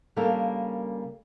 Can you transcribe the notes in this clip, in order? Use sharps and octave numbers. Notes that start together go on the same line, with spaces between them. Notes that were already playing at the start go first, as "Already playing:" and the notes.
C#3 G3 A#3 D4 A4 A#4